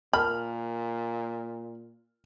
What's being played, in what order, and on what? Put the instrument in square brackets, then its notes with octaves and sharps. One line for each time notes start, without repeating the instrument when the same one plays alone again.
[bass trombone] A#2 [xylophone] A#4 A5 [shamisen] B5 [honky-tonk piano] F6